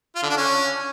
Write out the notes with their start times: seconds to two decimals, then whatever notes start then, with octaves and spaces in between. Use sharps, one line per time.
0.15 F4
0.22 D3
0.30 D4
0.37 C#4